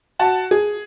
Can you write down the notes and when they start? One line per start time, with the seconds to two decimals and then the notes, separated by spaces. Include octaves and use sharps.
0.19 F#4 A5
0.51 G#4